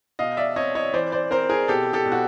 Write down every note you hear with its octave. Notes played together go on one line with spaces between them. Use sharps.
B2 D#5 F5
D5 E5
C4 C#5 D#5
C#5 D#5
E3 C5 D5
C5 D5
C4 A#4 C5
G#4 A#4
B2 G4 A4
G4 A4
B2
F#4